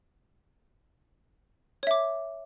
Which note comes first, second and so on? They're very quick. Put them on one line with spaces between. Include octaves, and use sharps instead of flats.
C#5 E5 D6